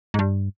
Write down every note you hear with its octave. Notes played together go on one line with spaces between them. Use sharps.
G#2
G2